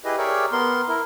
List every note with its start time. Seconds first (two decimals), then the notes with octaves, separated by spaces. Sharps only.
0.04 E4 G4 G#4 B4 D#5
0.18 G4 G#4 A#4 C#5 D5 E5
0.52 B3 A#4 C6
0.88 E4 A#4